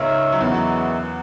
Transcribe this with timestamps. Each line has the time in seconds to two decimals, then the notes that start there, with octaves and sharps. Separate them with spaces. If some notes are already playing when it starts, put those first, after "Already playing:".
Already playing: C#2 C#3 D#4 A#4 C#5 E5
0.32 F#3
0.40 E2 E3 G#3 B3 F#4 A#4 E5
0.54 F#3